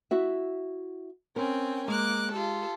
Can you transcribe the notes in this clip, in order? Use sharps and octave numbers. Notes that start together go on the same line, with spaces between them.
E4 F#4 E5
C4 C#4 A#4 G5
G#3 A#3 D6 F#6
F4 G4 A4